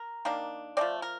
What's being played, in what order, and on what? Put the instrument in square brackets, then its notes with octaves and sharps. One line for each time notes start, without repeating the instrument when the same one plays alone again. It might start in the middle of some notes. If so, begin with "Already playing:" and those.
Already playing: [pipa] A#4
D#3 A#3 D4
F3 A3 C4 D5
A#4